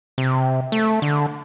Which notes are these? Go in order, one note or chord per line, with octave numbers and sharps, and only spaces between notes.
C3
A3
D3